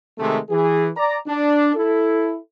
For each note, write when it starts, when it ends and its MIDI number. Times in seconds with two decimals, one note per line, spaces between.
0.18 0.38 48
0.18 0.38 51
0.18 0.38 56
0.18 0.38 57
0.49 0.87 52
0.49 0.87 68
0.97 1.15 74
0.97 1.15 82
1.27 1.70 62
1.75 2.36 64
1.75 2.36 69